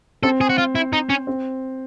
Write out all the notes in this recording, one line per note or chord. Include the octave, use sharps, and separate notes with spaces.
C4 A4
G#4
F#4
F4
E4
D#4
C#4
C4